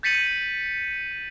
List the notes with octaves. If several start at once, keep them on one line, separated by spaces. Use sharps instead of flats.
G6 A6 B6 C#7 D#7 F#7